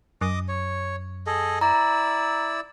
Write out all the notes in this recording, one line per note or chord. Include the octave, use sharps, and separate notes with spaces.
F#2 D#5 D6 D#6
C#5
G#4 A4 D#5
E4 D5 A#5 E6